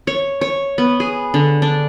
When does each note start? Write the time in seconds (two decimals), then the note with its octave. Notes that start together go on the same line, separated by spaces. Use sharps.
0.07 C#5
0.41 C#5
0.78 B3
1.00 G#4
1.34 D3
1.62 D4